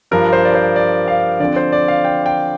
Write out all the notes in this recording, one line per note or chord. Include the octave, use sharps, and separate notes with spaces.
G2 F3 D4 A#4
C5
D5
C5
D5
F5
D3 F3 C4 D5
C5
D5
F5
G5
G5